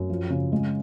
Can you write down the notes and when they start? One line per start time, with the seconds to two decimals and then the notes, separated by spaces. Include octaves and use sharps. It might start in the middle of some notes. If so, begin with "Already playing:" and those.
Already playing: F#2
0.10 F3
0.30 C#3
0.52 G#3